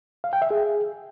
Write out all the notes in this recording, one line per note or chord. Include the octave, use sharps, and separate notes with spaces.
F5
G5
E5
G#4